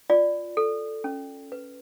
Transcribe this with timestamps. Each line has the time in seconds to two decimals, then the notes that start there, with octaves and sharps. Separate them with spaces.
0.10 F4 D5
0.57 A4
1.04 C#4
1.52 B4